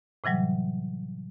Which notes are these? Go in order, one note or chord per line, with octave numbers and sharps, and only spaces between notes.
A2 C3 E3 F#3 G3